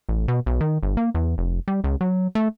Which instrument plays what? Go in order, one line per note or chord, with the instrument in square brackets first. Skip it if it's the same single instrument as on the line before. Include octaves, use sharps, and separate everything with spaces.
[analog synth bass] A1
B2
B1
D#3
G1
A#3
E2
F1
G3
C#2
F#3
A3